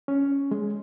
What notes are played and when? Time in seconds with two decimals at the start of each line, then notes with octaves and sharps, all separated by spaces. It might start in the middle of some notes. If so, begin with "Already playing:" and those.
0.08 C#4
0.51 G#3